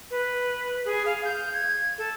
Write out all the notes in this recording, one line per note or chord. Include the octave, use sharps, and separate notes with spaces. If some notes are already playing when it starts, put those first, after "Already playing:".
B4
G#4
F5
G6
G#6
A4